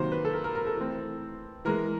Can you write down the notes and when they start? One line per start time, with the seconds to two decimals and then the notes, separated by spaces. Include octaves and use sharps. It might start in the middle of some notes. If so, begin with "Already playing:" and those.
Already playing: C3 D#3 F#3 A#3 C5
0.12 B4
0.25 A4
0.33 A#4
0.44 A#4
0.55 A#4
0.67 A4
0.77 E3 A3 C4
1.65 E3 G#3 B3 A#4